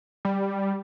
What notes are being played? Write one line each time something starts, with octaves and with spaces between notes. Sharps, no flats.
G3